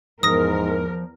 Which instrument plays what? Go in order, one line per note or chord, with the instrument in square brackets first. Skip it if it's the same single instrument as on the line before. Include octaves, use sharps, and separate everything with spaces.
[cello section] E2 A#4 [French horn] G#2 [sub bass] F3 [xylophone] D#6 A#6